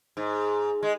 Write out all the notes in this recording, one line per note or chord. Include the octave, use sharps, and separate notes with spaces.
G#2
G#3